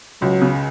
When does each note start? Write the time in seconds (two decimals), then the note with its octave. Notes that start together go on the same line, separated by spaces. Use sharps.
0.22 C#2 F#3
0.42 C#3